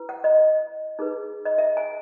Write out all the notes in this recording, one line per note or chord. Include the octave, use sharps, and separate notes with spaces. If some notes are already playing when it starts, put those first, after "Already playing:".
Already playing: E4 B4
F#5
D#5
D#4 G#4 B4
D#5
E5
G#5